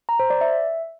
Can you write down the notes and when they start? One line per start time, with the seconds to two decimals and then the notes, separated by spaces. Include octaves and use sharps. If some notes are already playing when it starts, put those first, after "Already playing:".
0.09 A#5
0.19 C5
0.30 D5
0.41 E5